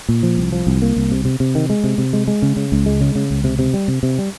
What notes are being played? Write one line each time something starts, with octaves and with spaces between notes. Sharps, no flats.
A#2
F3
C2
F3
C2
A#3
C2
C3
C3
C3
D#3
G#3
C3
C3
G#3
G#3
C#3
C#3
C#2
G#3
C#3
C#3
C#2
C3
C3
G3
C3
C3
G3